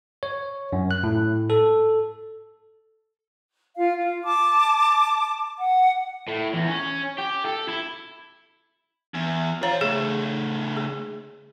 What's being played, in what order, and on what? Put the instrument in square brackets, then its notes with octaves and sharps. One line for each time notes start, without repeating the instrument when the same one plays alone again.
[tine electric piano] C#5
F#2
F#6
A2
A4
[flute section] F4 F5
F4
A5 D6
F#5
[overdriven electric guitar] A2
E2
C#4
G4
A4
E4
[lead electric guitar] E2
[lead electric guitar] C5 F5 [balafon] C#5 A#5
[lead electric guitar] C#3 A3 [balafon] G#4
[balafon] G#4